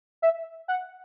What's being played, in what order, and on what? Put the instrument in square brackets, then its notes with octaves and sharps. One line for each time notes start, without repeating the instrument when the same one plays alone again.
[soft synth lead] E5
F#5